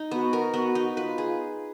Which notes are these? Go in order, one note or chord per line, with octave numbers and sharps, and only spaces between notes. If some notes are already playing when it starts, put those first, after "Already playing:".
Already playing: D#4
B3 F#4
A#4
B3 F#4
D#4
F4 B4
G#4